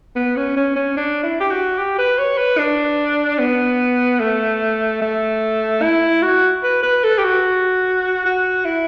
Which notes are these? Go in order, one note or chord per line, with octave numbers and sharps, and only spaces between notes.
B3
C#4
C#4
C#4
D4
E4
G4
F#4
G4
B4
C#5
B4
D4
B3
A3
A3
E4
F#4
B4
B4
A4
G4
F#4
F#4
E4